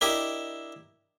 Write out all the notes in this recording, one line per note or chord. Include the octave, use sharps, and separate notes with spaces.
D4 E4 G4 A#4 D#5